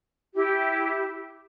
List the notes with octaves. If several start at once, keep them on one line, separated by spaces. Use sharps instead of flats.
E4 G4